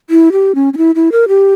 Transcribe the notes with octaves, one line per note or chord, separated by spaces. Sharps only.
E4
G4
C#4
C#4
E4
E4
A#4
G4